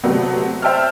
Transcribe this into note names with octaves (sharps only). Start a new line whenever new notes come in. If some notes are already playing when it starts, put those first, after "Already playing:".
C3 F#3 A3 B3 C4
C5 E5 G5 A5 E6 F6